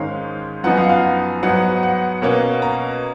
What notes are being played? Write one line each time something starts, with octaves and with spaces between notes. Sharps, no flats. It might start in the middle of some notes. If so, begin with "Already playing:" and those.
Already playing: G#2 D#3 G#3 C#4 F5
F#2 F3 B3 D#4 F#5
F5
F#5
F5
G#2 F#3 B3 D#4 F#5
F#5
B2 A#3 C#4
A#5